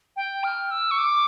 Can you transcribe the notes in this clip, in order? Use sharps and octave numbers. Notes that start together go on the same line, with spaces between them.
G5
F6
E6
C#6
D6